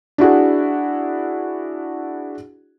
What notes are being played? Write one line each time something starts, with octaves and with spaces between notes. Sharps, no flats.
D4 E4 F#4 G#4